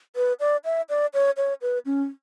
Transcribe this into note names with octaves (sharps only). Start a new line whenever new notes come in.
B4
D5
E5
D5
C#5
C#5
B4
C#4